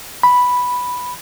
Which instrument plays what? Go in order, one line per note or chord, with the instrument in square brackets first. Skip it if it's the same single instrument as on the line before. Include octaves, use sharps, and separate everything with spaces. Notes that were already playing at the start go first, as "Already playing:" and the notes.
[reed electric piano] B5